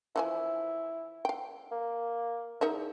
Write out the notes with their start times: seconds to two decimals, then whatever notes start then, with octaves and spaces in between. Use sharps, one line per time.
0.16 E3 F3 E4 G#5
1.25 F5 G5
1.72 A#3
2.61 E2 D#4 A#4 E5